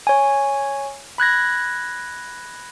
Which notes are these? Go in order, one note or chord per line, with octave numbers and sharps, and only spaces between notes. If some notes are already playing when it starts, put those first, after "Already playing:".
C#5 G#5
B5 F#6 G#6 A#6